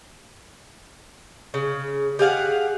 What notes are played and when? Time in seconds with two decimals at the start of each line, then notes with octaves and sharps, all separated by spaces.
1.54 C#3
2.19 G4 G#4 F5 F#5